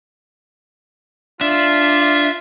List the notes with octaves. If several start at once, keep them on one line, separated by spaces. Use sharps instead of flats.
D4 F4 E5